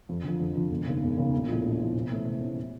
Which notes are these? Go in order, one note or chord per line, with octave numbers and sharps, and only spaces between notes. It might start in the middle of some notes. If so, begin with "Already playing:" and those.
F2
D3 F3
F2
D3 F3
E1
D#2 C#3
E1
D#2 C#3
A#1
A2 F3
A#1
A2 F3
C3
E3 A3 C#4
C3
E3 A3 C#4